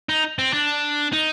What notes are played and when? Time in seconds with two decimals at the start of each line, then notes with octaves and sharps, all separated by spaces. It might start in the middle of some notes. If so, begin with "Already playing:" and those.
0.09 D#4
0.39 C4
0.53 D4
1.13 D#4